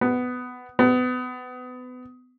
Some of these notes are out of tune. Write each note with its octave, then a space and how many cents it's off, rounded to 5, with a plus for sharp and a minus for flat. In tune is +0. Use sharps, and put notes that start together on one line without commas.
B3 +15
B3 +30